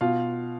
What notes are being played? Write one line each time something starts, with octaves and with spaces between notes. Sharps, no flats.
B2 F4 F5